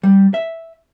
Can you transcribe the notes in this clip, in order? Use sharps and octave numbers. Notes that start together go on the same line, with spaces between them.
G3
E5